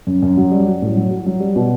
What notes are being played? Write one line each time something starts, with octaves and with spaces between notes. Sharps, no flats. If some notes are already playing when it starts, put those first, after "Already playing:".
F#2
F#2
F#3
G3
F#4
A2
F#3
F#4
F#3
G3
B2